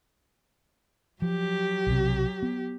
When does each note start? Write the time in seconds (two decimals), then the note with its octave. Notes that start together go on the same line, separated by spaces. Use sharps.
1.22 F3 F#3 G4
1.87 B1 C3
2.42 B3